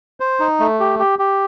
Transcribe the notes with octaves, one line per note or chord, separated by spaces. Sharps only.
C5
D#4
A3
G4
G4
G4